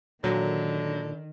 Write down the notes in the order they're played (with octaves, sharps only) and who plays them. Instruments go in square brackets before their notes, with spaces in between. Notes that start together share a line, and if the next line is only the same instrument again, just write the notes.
[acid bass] A#2 [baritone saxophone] D3 [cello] D#3 [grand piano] F#3